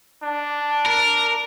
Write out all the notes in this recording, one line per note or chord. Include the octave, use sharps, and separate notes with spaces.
D4
A#4